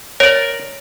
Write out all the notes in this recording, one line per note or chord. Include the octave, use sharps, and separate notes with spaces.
A#4 C#5 D5